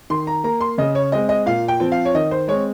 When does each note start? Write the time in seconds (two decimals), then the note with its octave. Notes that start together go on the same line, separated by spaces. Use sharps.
0.10 D#3 C6
0.27 A#5
0.44 A#3 A#5
0.61 C6
0.78 C#3 D#5
0.95 C#5
1.12 G#3 C4 D#5
1.29 D#5
1.46 A#2 F5
1.68 G5
1.80 F3 C4
1.92 F5
2.05 C#5
2.14 D#3 D#5
2.31 C5
2.48 G#3 C4 C#5